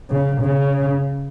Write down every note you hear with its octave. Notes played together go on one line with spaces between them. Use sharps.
C#3
C#3